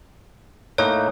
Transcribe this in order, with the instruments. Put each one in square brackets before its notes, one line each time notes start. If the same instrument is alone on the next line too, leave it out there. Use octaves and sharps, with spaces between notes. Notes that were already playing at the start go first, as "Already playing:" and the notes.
[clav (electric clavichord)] A2 A#3 D#4 [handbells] C#5